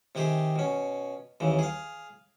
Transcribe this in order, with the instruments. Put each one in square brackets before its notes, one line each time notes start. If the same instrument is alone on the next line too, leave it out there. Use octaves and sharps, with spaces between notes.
[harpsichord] C3 D#3 G4 G#4
B2 C#4
D#2 C#3 E3
G#4 F5